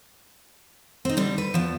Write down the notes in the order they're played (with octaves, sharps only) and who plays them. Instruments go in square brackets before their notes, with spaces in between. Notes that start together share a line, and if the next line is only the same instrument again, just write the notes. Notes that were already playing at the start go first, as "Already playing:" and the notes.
[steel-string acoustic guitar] C4 D#4
D3 G3
B4
E2 F3